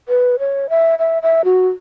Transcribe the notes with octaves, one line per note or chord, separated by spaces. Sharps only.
B4
C#5
E5
E5
E5
F#4